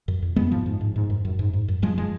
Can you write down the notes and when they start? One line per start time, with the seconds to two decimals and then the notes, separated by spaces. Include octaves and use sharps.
0.08 F#2
0.22 F2
0.36 F2 G#3 B3
0.51 G#2 F3
0.66 G#2
0.81 G#2
0.96 G#2
1.10 F#2
1.25 F#2
1.39 G#2
1.53 G#2
1.68 F#2
1.82 F#2 F3 G#3
1.98 F3 G#3